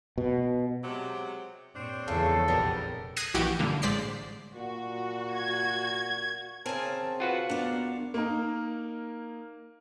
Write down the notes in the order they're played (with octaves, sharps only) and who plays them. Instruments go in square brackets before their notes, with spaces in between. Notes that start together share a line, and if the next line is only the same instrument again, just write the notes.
[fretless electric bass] B2
[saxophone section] C3 F#3 G#3
[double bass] G2 A#2 [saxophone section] C4 D4 C#5
[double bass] E2 F3 [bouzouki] C#3 G#3 A3 [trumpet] A4
[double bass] F1 A#1 [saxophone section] F2 G#2 A#4 [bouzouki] D#3 G3 B3
[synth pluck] D#6 F#6 G#6 A#6 C7 D#7
A#1 E3 F#4 G4 D7
G2 A#2 D3 A#3
A1 G#3 C5 D5 B6 C7
[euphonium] A#2 [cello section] F#4
[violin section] G#6
[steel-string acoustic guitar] C#3 C4 [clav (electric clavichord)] A#4 G#5 [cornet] A5
[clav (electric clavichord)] F4 F#4 B4 [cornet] F#5
[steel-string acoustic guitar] A#3 D5 [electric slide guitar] B3 D4 A#4 [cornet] F#5
[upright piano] A#3 D#4 A#4